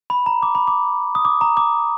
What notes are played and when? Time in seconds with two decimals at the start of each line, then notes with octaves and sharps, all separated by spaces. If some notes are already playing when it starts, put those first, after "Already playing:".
0.10 B5
0.26 A#5
0.42 D6
0.55 B5
0.67 D6
1.15 D#6
1.25 D6
1.41 A#5
1.57 D6